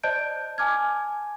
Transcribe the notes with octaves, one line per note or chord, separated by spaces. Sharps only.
C5 D5 D#5 A5 G6 D7
G#5 A5 D6 F6 G#6